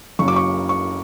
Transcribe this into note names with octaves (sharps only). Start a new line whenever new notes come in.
F#1 F#2 C#3 F#3 C#6
D6
C#6
C#6